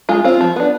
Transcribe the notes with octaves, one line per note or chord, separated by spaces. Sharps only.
G#3 F4
C4 F4
F3
B3 D4